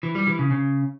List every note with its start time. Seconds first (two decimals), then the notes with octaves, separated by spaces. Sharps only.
0.03 E3
0.15 G3
0.27 E3
0.39 C#3
0.51 C#3